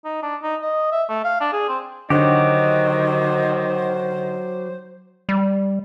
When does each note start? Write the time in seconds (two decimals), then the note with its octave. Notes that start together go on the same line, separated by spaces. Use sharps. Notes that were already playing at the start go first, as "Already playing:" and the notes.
0.05 D#4
0.23 D4
0.43 D#4
0.62 D#5
0.92 E5
1.09 A3
1.25 F5
1.41 D4
1.53 G#4
1.69 C4
2.10 D3 D#3 F#3 F#4 G4 C5
5.29 G3